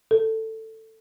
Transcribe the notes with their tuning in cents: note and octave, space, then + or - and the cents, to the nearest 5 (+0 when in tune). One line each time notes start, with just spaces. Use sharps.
A4 +15